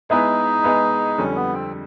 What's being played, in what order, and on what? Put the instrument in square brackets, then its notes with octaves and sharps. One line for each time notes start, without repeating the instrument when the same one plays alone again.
[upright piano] G#3 B3 E4 G#4 B4 [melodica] D#4
[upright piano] G#3 B3 E4 G#4 B4
[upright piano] F2 D3 G3 [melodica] C#4
[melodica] B3
C4